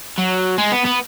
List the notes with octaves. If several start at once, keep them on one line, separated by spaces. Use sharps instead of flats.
F#3
G#3
B3
B3